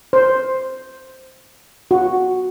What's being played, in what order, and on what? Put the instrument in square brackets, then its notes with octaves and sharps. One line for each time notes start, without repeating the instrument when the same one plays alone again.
[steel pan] C5
F#4